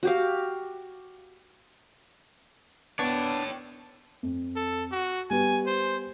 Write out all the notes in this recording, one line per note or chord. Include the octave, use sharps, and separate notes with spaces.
F#4 G4 F5
B3 D4 C#5 G5
F2
A4
F#4
G3 B3 G4 G#5
C5